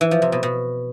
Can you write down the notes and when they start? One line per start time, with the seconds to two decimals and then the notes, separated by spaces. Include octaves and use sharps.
0.01 E3
0.11 F3
0.22 C3
0.32 B2
0.43 B2